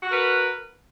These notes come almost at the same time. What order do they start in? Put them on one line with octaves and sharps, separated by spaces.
F#4 A#4 B4